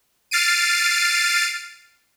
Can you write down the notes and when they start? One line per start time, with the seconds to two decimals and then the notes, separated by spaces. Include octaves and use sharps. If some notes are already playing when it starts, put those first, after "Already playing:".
0.31 F6 A6 C7 D7 D#7